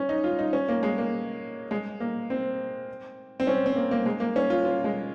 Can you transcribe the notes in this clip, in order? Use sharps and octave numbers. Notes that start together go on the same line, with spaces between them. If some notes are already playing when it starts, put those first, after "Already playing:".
Already playing: C#4
D#4
F4
D#4
C#4
A#3
G#3
A#3
G#3
A#3
C4
C4
C#4
C4
A#3
A#3
G#3
A#3
C#4
F4
F4
G#3